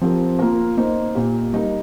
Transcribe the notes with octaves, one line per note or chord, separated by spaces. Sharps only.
F3 C4 G4 A#4
A#3 F4 A#4
A#3 D#4 C5
A#2 A#3 G4
G3 D#4 A#4